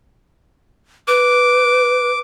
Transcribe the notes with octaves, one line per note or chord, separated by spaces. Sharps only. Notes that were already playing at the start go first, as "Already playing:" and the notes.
B4 D6